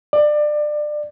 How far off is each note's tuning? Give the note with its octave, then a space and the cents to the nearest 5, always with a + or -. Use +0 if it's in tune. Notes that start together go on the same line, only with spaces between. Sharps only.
D5 +25